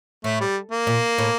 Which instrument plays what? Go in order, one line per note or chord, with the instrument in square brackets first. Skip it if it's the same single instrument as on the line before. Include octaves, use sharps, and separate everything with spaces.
[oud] A2 [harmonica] A3
[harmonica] G3
A#3
[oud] A#2
A2